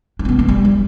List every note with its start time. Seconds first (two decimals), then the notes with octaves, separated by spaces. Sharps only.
0.19 D4
0.25 C4
0.29 B3
0.39 A3
0.48 G3
0.65 G3